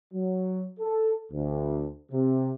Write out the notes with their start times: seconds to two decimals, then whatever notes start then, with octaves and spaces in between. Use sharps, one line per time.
0.14 F#3
0.80 A4
1.32 D2
2.12 C3